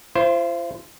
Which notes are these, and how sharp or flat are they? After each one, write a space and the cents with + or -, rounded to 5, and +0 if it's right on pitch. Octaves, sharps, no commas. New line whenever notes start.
F4 -45 C5 +0